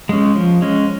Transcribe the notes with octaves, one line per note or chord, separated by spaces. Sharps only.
G#3 C#4
F3
G#3 C#4